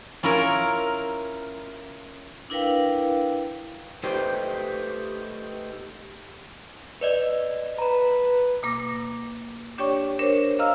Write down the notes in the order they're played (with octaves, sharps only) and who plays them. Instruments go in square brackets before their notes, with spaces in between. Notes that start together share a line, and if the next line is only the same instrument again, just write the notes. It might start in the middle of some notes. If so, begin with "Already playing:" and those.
[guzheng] C#4 E4 F4 A#4
[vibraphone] D4 E4 A#4 B4 F5 G5
[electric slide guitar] A3 D#4 G4 B4 C5 G5
[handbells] B4 D5 D#5
[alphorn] B4 [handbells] A#5 B5
[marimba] B2 A#3 D6 A#6
D4 G4 C#5 D5 G5 C#6
D4 A#4 C5 C#5
D#5 F5 A#5 E6 F6